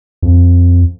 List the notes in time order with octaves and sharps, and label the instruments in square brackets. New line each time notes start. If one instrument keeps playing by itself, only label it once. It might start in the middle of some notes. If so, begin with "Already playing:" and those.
[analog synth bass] F2